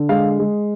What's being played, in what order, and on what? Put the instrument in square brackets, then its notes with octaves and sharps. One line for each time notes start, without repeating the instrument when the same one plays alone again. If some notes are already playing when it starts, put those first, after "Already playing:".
Already playing: [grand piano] D3
G#3 F5
G#3